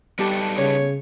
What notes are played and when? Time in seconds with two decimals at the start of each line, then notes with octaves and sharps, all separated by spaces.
0.19 G3 B3 D#4 G4 A4 A5
0.58 C#3 C#5